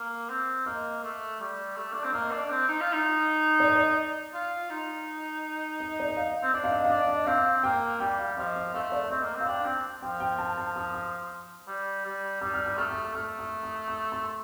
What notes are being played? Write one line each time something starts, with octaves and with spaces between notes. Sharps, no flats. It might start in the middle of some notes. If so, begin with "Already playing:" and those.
Already playing: A#3
C4
A#3 D#5
A3
G3
A3
D4
C4
A#3 D#5
D4
C4
D#4
F4
D#4
D5
D#5
D5
F4
D#4
D#5
D5
D#5
F5
C4
D4 D#5
F5
D#5
F5
D4 D#5
D#5
C4 F5
A#3 G5
G3 G5
F5
F3 D#5
D#5
A3 F5
D5
C4 D#5
A#3
C4
F5
D4 G5
C4 G5
F3 G5
G5
A5
A5
D#6
D#6
G3
G3
G3 D#6
F6
D#6
A3 F6
D#6
A3 F6
D#6
D#6
D#6
C6